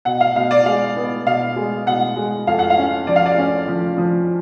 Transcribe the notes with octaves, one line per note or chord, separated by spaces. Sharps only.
B2 F#5
F5
B2 F5
D5
G#3 F5
B3
B2 F5
G#3
B2 F#5
G#3
F2 F5
F#5
F5
C#4
F3 D5
F5
D5
C#4
F3
F3